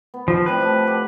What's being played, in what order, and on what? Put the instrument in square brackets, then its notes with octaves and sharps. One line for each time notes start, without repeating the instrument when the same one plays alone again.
[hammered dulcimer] B3
[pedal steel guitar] F3
[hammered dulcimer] A2 C3 G3 [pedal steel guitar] B4
[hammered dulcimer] F3 D#4
G4 F#5